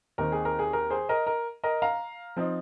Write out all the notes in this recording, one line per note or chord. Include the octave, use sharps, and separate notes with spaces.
D#2 D#3 C4 A#4
G#4
A#4
G#4
A#4
G#4 C5
A#4 D#5
A#4
A#4 D#5
F5 A#5
F3 C4 D#4